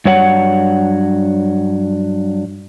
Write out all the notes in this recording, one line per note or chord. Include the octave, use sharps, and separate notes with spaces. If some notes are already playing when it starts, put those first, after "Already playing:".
G2 F#3 C#5 F#5